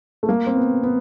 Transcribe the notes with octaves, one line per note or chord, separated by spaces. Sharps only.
A3
A#3
C4
B3
B3